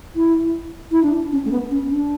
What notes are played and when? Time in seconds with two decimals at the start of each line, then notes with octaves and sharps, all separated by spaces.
0.16 E4
0.91 E4
1.03 D4
1.32 C#4
1.45 A3
1.51 B3
1.71 C#4
1.90 D4